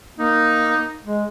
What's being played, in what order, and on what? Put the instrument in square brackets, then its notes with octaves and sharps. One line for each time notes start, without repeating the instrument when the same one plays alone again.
[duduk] A#3 [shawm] D#4
[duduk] G#3